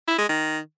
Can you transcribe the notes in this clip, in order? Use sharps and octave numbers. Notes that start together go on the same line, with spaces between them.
E4
G#3
D#3